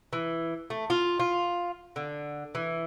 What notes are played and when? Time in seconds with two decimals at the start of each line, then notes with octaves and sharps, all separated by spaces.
0.13 E3
0.70 A3
0.90 F4
1.20 F4
1.96 D3
2.55 E3